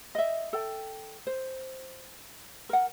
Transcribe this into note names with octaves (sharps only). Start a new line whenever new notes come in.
D#5 E5
A4 G5
C5
A#4 F#5